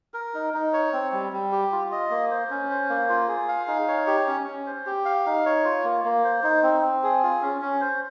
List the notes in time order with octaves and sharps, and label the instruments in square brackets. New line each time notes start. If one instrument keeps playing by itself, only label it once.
[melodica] A#4
D#4
D#4
C#5
C4
G3
G3
G4
F4
D#5
A#3
C5
C#4
C5
A#3
F4
G#4
F5
D#4
C#5
G4
C#4
C#4
C5
G4
F5
D#4
C#5
F4
A#3
A#3
C5
D#4
C4
C4
G#4
F4
C#4
C#4
C5